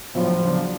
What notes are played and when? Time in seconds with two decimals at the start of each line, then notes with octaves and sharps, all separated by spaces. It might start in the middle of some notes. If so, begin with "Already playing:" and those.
0.14 A2 F3 F#3 B3 D4
0.43 C#3 F#3 B3 D4